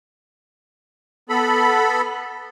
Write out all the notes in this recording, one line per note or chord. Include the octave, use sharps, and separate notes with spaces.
B3 A4 B5